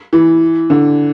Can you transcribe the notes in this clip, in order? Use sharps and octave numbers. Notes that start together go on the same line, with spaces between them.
E3
D3